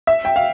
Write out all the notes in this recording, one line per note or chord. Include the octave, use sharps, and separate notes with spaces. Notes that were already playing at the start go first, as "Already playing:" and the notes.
E5
G5
F5